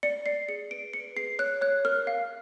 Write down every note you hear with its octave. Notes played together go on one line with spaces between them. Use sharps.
D5 C#7
D5 C7
G#4 C#7
B4 D7
B4 C#7
G#4 C7
C#5 F#6
C#5 F#6
A#4 F6
F5